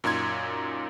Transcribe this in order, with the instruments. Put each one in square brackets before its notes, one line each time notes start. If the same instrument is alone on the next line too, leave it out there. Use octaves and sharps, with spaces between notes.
[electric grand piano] F#2 A#2 D#4 C6 G#6